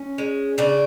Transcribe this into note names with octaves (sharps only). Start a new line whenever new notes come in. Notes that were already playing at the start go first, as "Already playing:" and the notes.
Already playing: C#4
G#3
C#3 D4